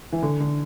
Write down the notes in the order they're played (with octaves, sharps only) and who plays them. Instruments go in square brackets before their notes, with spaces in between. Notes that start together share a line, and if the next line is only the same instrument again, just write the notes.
[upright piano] E3
D3
D3